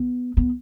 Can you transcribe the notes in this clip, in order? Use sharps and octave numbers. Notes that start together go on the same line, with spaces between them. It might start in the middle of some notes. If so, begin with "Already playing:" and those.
Already playing: B3
B3